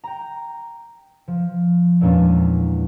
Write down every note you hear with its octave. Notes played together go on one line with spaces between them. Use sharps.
G5 A#5
F3
E2 A#2 G#3 A#3 C#4 D4